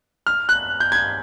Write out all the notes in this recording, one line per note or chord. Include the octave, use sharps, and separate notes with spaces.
F6
F#6
G6
G#6